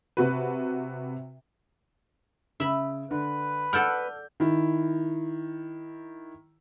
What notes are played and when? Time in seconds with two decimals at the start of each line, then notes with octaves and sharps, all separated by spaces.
0.17 C3 F#4 B4
2.60 C#3 E5 B5
3.11 D3 B4
3.73 A4 D5 F#5 F6 G6
4.40 D#3 E4